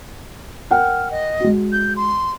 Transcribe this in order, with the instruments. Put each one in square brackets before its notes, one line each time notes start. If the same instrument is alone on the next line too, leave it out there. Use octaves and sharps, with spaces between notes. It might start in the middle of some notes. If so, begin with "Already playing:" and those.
[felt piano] A#4 F#5 G5 [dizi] F6
[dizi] D#5
[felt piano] G#3 F#4
[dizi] G6
C6